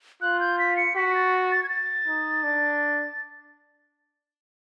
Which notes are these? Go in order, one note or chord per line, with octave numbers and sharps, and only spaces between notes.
F4 F#6
G6
B6
C#7
F#4 B6
A6
A6
G#6
A6
D#4
D4